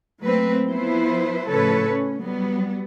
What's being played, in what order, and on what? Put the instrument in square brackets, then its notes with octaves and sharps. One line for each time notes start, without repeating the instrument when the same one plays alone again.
[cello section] F#3 A3 A#3 C4 B4
F3 B3 E4 B4 C5
A2 C#3 F3 A4 B4 C#5
C#4
F#3 G3 B3